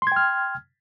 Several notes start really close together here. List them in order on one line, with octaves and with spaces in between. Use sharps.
C6 G#6 G5 F6